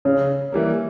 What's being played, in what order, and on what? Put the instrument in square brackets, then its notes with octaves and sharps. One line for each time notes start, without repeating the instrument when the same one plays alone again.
[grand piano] C#3 [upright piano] C#4
[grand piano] E3 G3 A#3